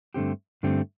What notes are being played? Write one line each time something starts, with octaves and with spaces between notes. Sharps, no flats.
G2 D3 A3 C4 G4
G2 D3 A3 C4 G4